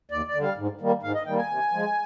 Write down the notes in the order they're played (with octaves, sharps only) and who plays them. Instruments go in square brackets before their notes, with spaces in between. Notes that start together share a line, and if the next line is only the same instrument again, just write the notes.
[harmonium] D#2 D5
D5
D3
G3 F5
G#2
D#3 G3 A#3
G#2 F5
D#5
D#3 G3 A#3 G5
G#5
C3
F3 G#3